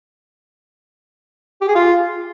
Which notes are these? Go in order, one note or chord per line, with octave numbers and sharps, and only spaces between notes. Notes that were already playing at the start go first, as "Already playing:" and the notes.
G4
G#4
F4